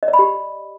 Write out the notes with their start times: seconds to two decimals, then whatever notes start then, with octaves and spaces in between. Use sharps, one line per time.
0.03 D#5
0.08 D5
0.13 B5
0.19 G4